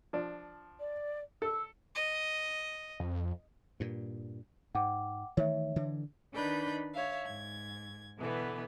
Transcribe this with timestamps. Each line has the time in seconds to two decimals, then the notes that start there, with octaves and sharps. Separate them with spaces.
0.13 F3 D4
0.79 D5
1.42 A4 E6
1.95 D#5
3.00 F2
3.80 G2 A#2
4.75 G#2 F#5 G5 D6
5.37 D#3 E3 A3 C#5 E5
5.76 D3 E3
6.33 D#3 D4 D#4 B4 B5 G6
6.93 C#5 E5 F5
7.25 G#2 G#6
8.18 B2 D3 E3 B3